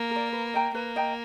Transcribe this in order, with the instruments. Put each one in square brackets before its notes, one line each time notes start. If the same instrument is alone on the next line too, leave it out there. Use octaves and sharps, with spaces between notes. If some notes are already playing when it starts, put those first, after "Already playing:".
Already playing: [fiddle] A#3
[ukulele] A#4 D5
B4
D#5 G5 A#5
[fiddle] A#3 [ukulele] B4
[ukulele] D#5 G5 A#5